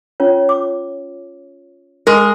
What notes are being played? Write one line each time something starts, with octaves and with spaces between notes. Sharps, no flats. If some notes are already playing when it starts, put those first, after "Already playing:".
C#4 F4 C#5
D6
G#3 G#4 A#4